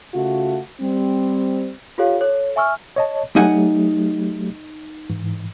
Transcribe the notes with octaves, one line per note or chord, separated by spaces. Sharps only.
C#3 A3 F4 F#4
G3 C4
F4 G4 A4 C#5 F5
A4 C#5
E5 G#5 C#6 E6 F6
C#5 D#5 A5
F#3 A3 D#4 G4 F#5 G#5
G#2 E3